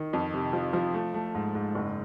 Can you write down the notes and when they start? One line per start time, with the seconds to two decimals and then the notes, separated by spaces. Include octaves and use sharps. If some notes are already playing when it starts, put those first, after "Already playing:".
Already playing: D#3
0.13 F2
0.34 C3
0.53 F3
0.73 F3
0.94 A3
1.14 A3
1.35 G#2
1.55 G#2
1.75 F#1